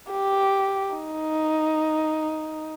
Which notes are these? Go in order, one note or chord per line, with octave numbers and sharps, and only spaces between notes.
G4
D#4